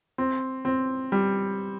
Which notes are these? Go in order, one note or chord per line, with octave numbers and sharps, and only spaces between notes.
C4
C4
G3